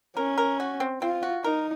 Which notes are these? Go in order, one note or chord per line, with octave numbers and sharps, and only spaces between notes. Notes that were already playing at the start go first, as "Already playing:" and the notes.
C#4 A#4
A#4
F#4
C4
C4 F4
F#4
D#4 A#4